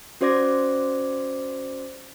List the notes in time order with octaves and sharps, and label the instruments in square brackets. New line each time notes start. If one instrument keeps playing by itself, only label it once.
[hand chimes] C#4 F#4 C5 D5 D6 A#6